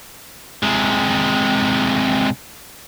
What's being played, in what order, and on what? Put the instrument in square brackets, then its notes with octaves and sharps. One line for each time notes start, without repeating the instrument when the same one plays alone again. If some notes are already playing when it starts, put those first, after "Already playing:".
[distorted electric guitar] C3 G#3